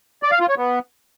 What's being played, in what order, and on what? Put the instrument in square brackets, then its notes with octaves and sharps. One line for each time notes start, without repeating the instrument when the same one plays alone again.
[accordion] D5
F5
F4
C#5
B3